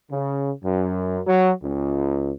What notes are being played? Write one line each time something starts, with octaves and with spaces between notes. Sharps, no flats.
C#3
F#2
F#3
C#2